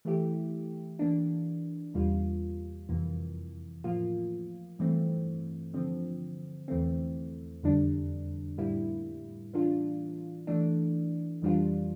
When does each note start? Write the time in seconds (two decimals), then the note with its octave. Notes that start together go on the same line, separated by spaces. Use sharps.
0.05 E3 A3 E4 G4
0.99 E3 A#3 D4
1.94 E2 C3 G3 A#3 F4
2.89 F2 C3 E3 A#3
3.84 A2 F3 A#3 F4
4.79 G2 E3 A3 C4
5.74 D3 F3 C4
6.68 E2 E3 A3 C4
7.63 F2 D3 G3 D4
8.58 A2 G3 A#3 E4
9.53 E3 A#3 D4 F4
10.47 E3 A3 D4
11.42 F2 E3 G3 D4 F4